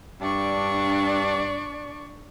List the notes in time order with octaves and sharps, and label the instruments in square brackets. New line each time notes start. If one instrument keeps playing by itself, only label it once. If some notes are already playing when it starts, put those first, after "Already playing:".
[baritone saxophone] G2 [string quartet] D4 D5 C#6